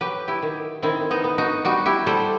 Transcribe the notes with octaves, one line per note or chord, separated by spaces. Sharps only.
F#3 G4 B4
E4 G4
D#3
D#3 C4 E4
B3 D#4
B3
D#4 F#4
G3 D#4 F#4
E4 G4
G3 A4 C5